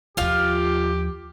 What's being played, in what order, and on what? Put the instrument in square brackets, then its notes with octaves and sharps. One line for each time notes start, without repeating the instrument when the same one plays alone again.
[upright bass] D#2 F3 [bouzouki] F4 F5 [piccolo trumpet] G4